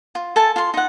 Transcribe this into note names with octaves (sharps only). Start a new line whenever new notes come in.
F4
A4 G#5 A5
F4 C6
D#4 F#5